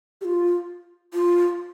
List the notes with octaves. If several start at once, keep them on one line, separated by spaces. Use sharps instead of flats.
G4
F4
F4